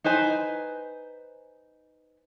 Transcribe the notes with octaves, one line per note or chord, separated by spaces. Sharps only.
D#4 B4 C5 G#5